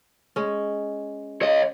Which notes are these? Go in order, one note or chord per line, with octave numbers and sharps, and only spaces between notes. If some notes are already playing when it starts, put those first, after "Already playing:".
G#3 C#4
C#5 D#5